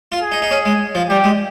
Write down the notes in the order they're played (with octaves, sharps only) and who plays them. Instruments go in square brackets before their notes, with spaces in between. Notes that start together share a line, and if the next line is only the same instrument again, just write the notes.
[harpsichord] F4
[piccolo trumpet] G#4
[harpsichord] D#4
D#4
C#4
G#3
F3
[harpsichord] G3 [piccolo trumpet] G4
[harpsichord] G#3